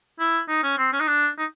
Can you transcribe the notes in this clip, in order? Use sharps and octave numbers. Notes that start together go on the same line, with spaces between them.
E4
D#4
C#4
C4
C#4
D#4
D4
D#4